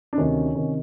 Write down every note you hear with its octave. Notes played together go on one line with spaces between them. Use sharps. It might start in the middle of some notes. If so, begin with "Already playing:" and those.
D4
D2 C3 D#3 C#4
C3 D#3